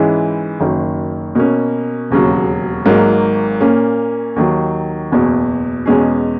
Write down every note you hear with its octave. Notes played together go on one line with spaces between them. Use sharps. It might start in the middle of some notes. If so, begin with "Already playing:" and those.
Already playing: G#2 E3 G#3 C#4 E4
F#1 F#2 D#3
B2 A#3 C#4
E1 D#2 C#3 F#3
G#1 G#2 F#3 A#3
A#2 A#3 C#4
D#2 D#3 F#3
F#1 E2 B2
E2 B2 G#3 C#4 G#4